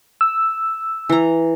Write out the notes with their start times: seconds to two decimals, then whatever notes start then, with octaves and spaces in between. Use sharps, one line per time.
0.21 E6
1.09 E3 A#5